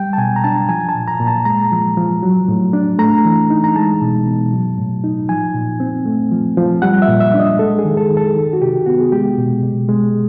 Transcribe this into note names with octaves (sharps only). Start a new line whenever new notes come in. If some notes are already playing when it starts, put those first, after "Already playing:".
Already playing: G3 G5
A5
B2 G#5
A#5
D4 A5
F3 G#5
A5
A#2
A#5
A#2
A5
G#3 A#5
F3
F3
F#3
A2
D4
A3 A#5
E3
D#4
A#5
G#3 A5
B2
B2
F#3
A2
D#4
F3 G#5
A#2
C4
A3
F3
F3
G3 F#5
E5
A#2
E5
D4
D#5
G#3 A4
G#4
D#3
A4
D#3
A4
D#3
F#4
C3 G4
B3 F#4
G#4
G#3 G4
B2
B2
G#3